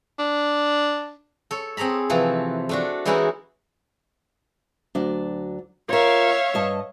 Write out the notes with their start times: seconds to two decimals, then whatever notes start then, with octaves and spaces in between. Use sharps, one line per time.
0.19 D4
1.51 A4 C#5
1.77 C4 G#4 A4 A#5 B5
2.09 C3 E3 F3 A3
2.69 A3 D4 F#4
3.05 E3 G#3 C#4 D#4 E4 F#4
4.95 D2 F#3 D4
5.89 F4 A#4 C#5 E5 F5
6.54 G2 D#5 A5